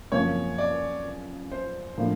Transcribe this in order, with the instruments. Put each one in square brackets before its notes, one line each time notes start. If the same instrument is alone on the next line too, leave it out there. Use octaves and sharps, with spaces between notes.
[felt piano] F#2 C#3 F3 A#3 [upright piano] C#5
[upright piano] D5
C5
[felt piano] A2 F3 A#3 D4